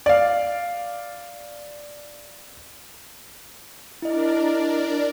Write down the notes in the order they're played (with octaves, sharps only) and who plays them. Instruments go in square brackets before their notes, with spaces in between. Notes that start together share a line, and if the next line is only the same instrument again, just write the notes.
[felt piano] D5 F5
[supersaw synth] D4 A#4 D5 [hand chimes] E4 D#5